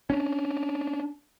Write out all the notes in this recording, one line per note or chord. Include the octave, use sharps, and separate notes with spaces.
C#4 D4